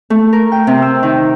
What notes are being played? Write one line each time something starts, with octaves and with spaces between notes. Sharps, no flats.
A3
A#4
G5
C3
E6
D#3